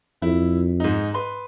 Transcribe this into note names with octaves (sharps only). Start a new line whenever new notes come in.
F2 E4
G#2 D#4
B4 C6